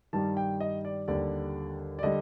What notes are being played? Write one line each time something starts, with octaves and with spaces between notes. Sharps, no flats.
G2 D#3 G3 A5
G5
D#5
D5
D#2 D3 G3 D5
D5
D3 G3 D#5